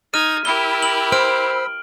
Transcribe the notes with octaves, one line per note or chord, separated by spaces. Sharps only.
D#4 F6 G#6 D#7
E4 G4 A#4 B5 E6 G7
F#7
C5 F6 D7